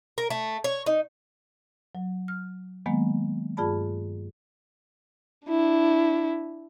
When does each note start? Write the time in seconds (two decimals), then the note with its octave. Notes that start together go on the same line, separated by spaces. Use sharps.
0.18 A#4
0.30 A3
0.64 C#5
0.86 D#4
1.95 F#3
2.28 F6
2.86 D#3 F#3 G#3 A#3 B3
3.57 G2 F4 G#4 D5 A5 B5
5.47 D4 E4